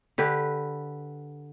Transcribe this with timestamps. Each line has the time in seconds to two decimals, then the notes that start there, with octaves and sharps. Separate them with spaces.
0.18 D3 G4 B4